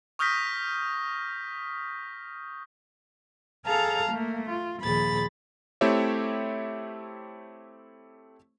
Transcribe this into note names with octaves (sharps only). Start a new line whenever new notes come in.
C#6 D#6 F6 G6 A#6 B6
G#4 A4 F5 A5 A#5
A3 A#3
F4
D#2 A#2 F3 G#4 B5 A6
A3 C4 E4 G4 C#5 E5